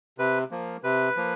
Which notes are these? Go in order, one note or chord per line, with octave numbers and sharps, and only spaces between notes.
C3 B4
F3 A#3
C3 B4
F3 A#3